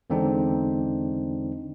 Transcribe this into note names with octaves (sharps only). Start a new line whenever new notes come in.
E2 D3 G#3 C4 D4 D#4